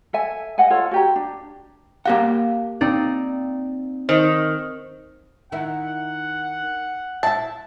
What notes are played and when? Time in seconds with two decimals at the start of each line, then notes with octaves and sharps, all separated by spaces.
0.13 A4 E5 G#5
0.58 D#5 F#5 G#5
0.70 F4 A4 C#5
0.91 F#4 G4 A#5
1.16 D4
2.06 A#3 G4 F5 F#5
2.81 C4 D#4 D5
4.09 D#3 C5
5.52 D#3 D#4 E4 F#5
7.23 E4 E5 A5